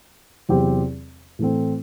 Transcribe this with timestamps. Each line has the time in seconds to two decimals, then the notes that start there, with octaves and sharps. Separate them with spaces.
0.49 E2 C3 F#3 C4 G4
1.39 A2 E3 A3 C4